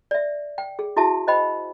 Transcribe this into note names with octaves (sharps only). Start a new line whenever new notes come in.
D5 E5
G5
G#4
E4 F#4 G#4 E5 A5
C5 D#5 G5 B5